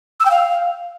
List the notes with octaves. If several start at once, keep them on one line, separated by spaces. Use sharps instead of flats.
E6
G5
F5